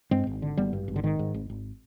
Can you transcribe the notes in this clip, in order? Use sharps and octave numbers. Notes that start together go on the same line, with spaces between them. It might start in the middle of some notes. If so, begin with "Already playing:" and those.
G2 G#3 C4
G#1
D3
G#1 G3 B3
G2
G#1
D3
G#2 D#3
G#2
G#1
G#1